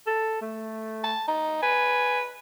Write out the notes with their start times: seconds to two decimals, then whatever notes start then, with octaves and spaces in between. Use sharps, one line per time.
0.07 A4
0.42 A3
1.04 A5
1.27 D#4
1.63 B4 G#5